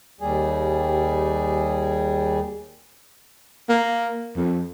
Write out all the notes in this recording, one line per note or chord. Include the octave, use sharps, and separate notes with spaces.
D#2 G3 G#4
A#3
F2